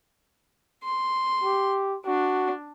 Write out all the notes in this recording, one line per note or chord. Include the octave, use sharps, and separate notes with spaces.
C6
G4
D4 F#4